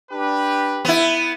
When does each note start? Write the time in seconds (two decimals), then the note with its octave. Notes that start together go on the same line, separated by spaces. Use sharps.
0.12 D4 G4 B4
0.85 B3 E4